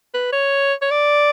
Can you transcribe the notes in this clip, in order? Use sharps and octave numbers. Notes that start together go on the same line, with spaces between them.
B4
C#5
C#5
D5